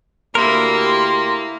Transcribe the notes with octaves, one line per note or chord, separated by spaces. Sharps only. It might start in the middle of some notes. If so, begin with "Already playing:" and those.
D2 A#3 E4 G4 A#4 C6